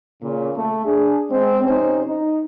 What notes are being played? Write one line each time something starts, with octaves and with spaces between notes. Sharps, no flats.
A#2 C#3
A3
D4 G#4
G#3 C4
F2 C3 C#4 D#4 C5
D#4